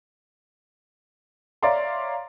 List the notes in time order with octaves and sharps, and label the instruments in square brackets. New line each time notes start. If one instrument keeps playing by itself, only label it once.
[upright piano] C#5 D5 E5 F5 A#5 C6